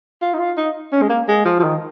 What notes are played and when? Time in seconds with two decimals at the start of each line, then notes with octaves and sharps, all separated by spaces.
0.22 F4
0.34 D#4
0.39 F4
0.57 D#4
0.92 C#4
1.02 G#3
1.10 A#3
1.28 G#3
1.45 F3
1.60 F3
1.63 D#3